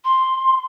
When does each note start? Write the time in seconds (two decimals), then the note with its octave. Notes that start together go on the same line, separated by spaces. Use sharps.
0.04 C6